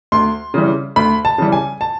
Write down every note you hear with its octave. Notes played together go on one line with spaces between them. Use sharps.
D2 C6
C#3 E3 G3
D2 B5
A5
C#3 E3 G3
G#5
A5